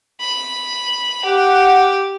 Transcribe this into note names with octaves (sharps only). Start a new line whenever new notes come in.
B5
G4 F#5